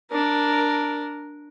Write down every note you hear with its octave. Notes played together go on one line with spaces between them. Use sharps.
D4 A#4